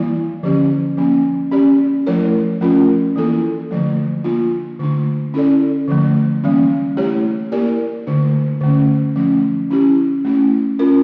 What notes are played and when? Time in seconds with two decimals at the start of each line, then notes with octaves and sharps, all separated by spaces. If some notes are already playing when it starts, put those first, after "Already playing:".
Already playing: E3 G3 A#3 E4
0.43 D3 F3 C#4 G4
0.97 F3 A#3 C#4
1.51 C#4 G4 D5
2.07 F3 A3 E4 A#4 C#5
2.61 F3 A3 C#4 F4 A#4
3.16 E3 A#3 E4 A4
3.71 D3 F3 A3
4.24 A#3 D4 F4
4.80 D3 A3 D4
5.34 C#4 E4 A4 D5
5.88 D3 F3 A3
6.44 E3 G3 A#3 C#4
6.97 A3 E4 G4 C#5
7.52 A#3 E4 G4 A#4 D5
8.07 D3 A3 D4
8.61 D3 A3 C#4
9.16 F3 A3 C#4
9.71 C#4 E4 G4
10.25 A3 C#4 E4
10.79 C#4 F4 A#4